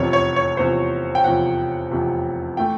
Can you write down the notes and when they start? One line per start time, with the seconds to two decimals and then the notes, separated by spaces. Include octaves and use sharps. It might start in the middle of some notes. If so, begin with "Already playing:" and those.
Already playing: F1 E2 C3 F3 C#5
0.13 C#5
0.36 C#5
0.57 F1 E2 C3 F3 C5
1.15 G5
1.24 F1 E2 C3 F3 F#5
1.91 F1 E2 C3 F3
2.57 E3 A3 G5